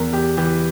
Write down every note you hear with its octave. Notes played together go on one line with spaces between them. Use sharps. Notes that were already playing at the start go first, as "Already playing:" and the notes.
Already playing: E2 A#4
E2 G4
E3 G4